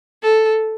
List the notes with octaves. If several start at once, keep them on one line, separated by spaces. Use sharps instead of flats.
A4